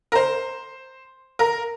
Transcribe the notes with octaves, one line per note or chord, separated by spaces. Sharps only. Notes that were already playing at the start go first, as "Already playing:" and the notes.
A#4
C5
A#4